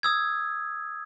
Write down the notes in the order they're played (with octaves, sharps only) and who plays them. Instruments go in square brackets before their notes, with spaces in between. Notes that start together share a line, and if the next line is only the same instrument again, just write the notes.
[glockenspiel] D#6 E6 G#6